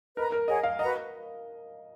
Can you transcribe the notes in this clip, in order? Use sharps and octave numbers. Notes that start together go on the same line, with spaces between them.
A#4 B4 D#5 A#5
A#4
G#4 C#5 D#5 F#5
F5
F#4 B4 D#5 F#5 A#5